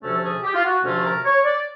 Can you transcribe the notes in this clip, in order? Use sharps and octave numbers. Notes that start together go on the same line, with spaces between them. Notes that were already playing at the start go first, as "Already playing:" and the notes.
D2 C3 F3 A3 C#4 A4
G#4
G4
F4
F#4
D2 C3 F3 A3 C#4 F4
A#4
C#5
D5